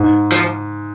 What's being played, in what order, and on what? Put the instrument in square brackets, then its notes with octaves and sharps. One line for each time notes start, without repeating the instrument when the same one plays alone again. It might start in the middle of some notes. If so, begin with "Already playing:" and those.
Already playing: [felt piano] G#2
[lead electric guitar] F3